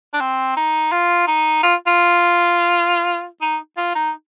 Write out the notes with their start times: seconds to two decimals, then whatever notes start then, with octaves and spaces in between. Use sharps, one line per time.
0.13 D4
0.20 C4
0.57 D#4
0.92 F4
1.27 D#4
1.63 F4
1.87 F4
3.41 D#4
3.77 F4
3.95 D#4